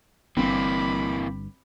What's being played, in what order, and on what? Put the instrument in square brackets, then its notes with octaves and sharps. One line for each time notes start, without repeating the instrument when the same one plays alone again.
[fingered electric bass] G1 G2 [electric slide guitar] E3 A#3 [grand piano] C4 [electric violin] B5 D6